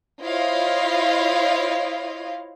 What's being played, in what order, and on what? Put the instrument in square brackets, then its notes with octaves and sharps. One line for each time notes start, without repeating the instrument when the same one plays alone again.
[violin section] E4 F4 C5 C#5 D#5 F5